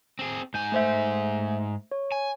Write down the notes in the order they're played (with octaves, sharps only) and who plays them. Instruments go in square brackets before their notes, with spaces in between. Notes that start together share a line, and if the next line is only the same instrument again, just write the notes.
[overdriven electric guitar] C4 G#4
[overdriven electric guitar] G#2 G#5 [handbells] G6
[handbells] A3 C5 E5
C#5
[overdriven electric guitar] G#5